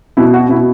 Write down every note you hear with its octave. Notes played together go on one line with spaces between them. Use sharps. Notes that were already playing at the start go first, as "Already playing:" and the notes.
B2 E4
F#4
B2 E4